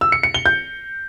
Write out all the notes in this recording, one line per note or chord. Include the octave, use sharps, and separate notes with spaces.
E6
C#7
C#7
G7
G6